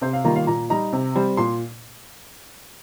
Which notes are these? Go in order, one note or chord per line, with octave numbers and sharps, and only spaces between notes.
C3 C5
F5
D#3 G3 A#3 F4 A#5
F5
A#2 A#5
G3 D#4 A#5
C3
G3 C4
A#2 C6